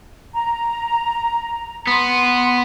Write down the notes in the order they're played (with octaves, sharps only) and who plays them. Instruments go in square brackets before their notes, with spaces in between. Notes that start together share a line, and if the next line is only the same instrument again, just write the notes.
[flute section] A#5
[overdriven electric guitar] B3 [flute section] C6